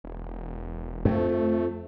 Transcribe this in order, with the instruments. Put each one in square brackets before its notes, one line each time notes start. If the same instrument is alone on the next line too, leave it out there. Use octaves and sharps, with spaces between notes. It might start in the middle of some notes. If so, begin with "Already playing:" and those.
[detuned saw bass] E1
[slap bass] F2 [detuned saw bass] A3